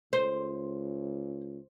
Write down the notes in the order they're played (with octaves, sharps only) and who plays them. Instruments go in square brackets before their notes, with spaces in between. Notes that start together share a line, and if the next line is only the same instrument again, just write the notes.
[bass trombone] C#2 [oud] C5